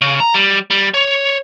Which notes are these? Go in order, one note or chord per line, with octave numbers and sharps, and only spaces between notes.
C#3
A#5
G3
G3
C#5